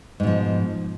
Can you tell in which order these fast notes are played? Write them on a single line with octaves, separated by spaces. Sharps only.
G#2 B2 F3